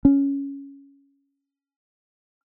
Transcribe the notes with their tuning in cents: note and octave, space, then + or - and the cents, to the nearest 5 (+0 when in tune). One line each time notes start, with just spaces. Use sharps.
C#4 +5